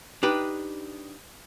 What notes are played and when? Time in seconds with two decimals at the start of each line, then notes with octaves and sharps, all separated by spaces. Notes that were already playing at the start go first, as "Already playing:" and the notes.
0.23 D4 D#4 G4 B4